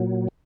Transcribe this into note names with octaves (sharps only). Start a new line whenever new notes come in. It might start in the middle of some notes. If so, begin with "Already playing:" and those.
Already playing: A#2 F#3